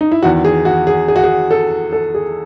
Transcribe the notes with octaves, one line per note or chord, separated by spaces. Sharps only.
D#4
E4
E2 D#3 F#4
G#4
F#4
G#4
G#4
F#4
G#4
A4
A4
G#4